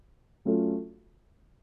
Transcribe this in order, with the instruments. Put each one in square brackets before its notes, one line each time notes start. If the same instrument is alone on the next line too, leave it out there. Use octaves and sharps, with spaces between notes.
[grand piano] F#3 A3 C#4 F4 A4